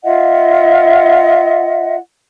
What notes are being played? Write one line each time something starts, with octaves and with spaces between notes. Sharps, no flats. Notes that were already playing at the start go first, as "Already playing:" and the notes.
F4 D#5 E5 F#5